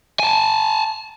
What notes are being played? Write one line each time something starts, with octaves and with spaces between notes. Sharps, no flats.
G#5 A5